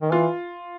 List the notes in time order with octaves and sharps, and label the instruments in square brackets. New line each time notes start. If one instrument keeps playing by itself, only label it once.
[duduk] D#3
[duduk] E3 [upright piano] F4